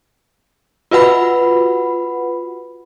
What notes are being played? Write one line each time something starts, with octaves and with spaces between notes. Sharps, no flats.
F4 F#4 B4 F#5 B5